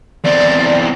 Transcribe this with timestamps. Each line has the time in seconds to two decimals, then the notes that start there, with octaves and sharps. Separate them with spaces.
0.24 E2 C4 D5